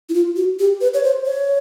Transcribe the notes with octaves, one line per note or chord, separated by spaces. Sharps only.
E4
F4
F#4
G4
B4
C#5
C5
C#5